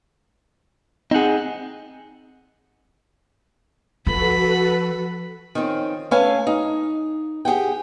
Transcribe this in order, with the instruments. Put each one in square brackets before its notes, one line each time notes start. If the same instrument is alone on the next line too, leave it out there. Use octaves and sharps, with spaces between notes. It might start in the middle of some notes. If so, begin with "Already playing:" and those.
[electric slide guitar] C4 F#5 [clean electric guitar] D#4 G#4
[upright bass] F3 [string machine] F#4 A4 B4 [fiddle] B5
[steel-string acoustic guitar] D#3 F3 C4 C#4
A3 C#4 B4 F5 G#5
D#4
G4 G#4 F#5 G5